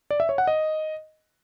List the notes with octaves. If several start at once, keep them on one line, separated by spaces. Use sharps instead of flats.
D5
E5
C#5
F#5
D#5